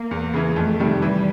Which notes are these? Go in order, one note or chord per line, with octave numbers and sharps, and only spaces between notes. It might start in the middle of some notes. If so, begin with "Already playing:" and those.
Already playing: A#3
E2
C#3 E3
F2 A3
C3 D#3 G3
E3 G3